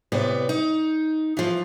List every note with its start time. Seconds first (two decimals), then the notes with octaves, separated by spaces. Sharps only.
0.12 A2 C3 B3 D5
0.49 D#4
1.37 E3 F3